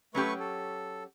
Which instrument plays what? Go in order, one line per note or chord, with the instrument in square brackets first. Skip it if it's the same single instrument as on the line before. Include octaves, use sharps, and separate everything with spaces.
[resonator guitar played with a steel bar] F#3 C#4 G4 [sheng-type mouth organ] A3 B4 C#6
[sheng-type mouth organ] A4